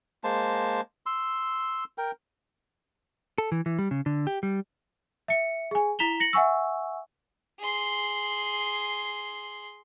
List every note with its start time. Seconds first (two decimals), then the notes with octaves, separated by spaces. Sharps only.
0.24 G#3 A#3 C5 A5
1.06 C6 E6
1.98 A#4 G5
3.38 A4
3.52 E3
3.66 E3
3.79 G3
3.91 C#3
4.06 D3
4.27 G4
4.43 G3
5.28 E5 C#7
5.71 G#4 G#5
5.99 E4 A#5 B6 E7 F7 G7
6.20 A#6 C#7 F#7
6.33 E5 F#5 G#5 C#6 E6
7.59 G#4 C6